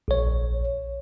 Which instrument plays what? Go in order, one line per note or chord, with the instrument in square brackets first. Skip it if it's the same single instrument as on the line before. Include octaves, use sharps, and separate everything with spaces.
[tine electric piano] A#1 C#5